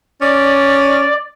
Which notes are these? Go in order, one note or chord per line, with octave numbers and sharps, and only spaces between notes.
C#4 D5